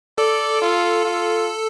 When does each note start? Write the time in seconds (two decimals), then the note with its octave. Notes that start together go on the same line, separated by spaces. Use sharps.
0.18 A4 D5
0.61 F4
1.05 F4